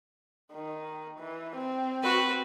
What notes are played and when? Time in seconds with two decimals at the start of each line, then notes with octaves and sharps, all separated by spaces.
0.52 D#3
1.19 E3
1.56 C4
2.02 F#4 B4